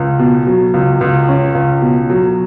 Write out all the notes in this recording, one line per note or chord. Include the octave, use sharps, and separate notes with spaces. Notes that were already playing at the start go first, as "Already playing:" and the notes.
Already playing: C#2
B2
F#3
C#2
C#2
C#4
C#2
B2
F#3